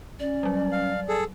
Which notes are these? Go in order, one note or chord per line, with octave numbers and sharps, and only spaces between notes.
C#4 D5
F#3 G3
F5
G#4 A4